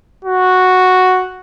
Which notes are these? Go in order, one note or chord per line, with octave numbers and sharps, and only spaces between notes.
F#4